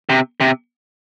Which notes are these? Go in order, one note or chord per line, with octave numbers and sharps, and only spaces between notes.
C3
C3